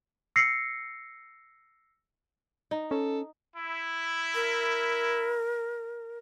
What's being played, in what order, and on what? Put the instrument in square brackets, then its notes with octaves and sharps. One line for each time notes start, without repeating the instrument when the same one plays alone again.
[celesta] E6 A#6 C7 C#7
[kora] D#4
[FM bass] C#4 [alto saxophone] A4
[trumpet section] E4
[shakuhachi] A#4